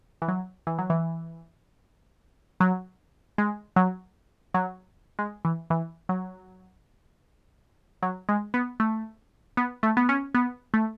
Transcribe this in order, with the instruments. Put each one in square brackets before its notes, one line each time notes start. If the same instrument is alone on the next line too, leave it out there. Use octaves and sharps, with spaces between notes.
[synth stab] E3
F#3
E3
F#3
E3
F#3
G#3
F#3
F#3
G#3
E3
E3
F#3
F#3
G#3
B3
A3
B3
A3
B3
C#4
B3
A3